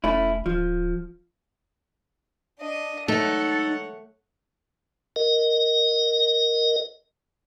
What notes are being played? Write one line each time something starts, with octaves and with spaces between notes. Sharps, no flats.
E1 A3 C#4 E4
D1 F3
D4 D#5
A3 D#4 A4 C#5 F#5
A#4 D#5